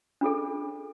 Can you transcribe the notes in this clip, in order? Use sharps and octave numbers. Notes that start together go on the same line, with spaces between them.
D4 F4 G#4 A4